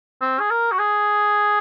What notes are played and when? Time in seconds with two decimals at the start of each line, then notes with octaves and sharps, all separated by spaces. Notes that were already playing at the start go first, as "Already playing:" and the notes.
0.21 C4
0.39 G#4
0.50 A#4
0.71 F#4
0.79 G#4